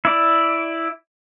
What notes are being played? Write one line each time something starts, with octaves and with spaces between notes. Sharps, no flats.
E4 D5